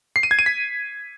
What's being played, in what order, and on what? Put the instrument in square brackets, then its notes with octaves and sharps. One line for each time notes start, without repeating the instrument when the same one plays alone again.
[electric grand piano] C7
D#7
G#6
D#7
B6